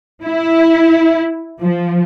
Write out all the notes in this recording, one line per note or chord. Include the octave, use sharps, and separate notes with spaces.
E4
F3